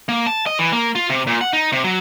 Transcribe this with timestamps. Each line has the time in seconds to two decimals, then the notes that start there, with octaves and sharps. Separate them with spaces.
0.09 A#3
0.26 A5
0.46 D#5
0.59 E3
0.72 A#3
0.95 F4
1.10 C3
1.27 A#2
1.41 F#5
1.53 D#4
1.72 C3
1.84 F#3